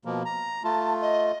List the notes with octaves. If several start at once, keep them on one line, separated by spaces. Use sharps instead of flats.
B2 F3 A#3
A#5
A3 F4 A5
D#5